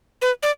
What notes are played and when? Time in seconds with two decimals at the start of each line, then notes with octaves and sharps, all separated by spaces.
0.22 B4
0.43 D5